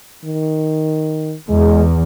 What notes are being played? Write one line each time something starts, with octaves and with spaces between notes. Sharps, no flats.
D#3
E2 G#3